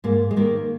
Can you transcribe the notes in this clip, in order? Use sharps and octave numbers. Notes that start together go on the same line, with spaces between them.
G#2 A#3
G#3
D#3 A#3